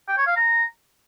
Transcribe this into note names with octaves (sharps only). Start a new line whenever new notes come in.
G5
C#5
F5
A#5